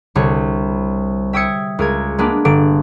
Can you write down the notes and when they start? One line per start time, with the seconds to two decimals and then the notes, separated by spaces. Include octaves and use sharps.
0.16 C2 D3 C#5
1.33 E5 G5 D#6 E6 G#6 C#7
1.79 C#2 A#4 G#6
2.18 G#3 A#3 B3 D4
2.45 G1 D3 D7